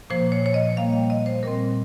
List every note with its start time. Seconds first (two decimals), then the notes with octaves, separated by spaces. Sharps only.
0.10 A#2 F3 A#3 C5
0.32 C#5
0.46 C#5
0.54 D#5
0.77 A#2 G3 A#3 F5
0.94 G5
1.10 D#5
1.26 C5
1.43 A#2 G3 C4 A#4